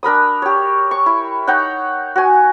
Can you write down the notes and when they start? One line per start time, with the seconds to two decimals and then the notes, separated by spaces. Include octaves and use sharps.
0.03 D4 A#4 B5 D#6
0.42 G4 C#5
0.91 C#6
1.06 E4
1.47 D#4 C#5 F#5 G5
2.16 F#4 G#5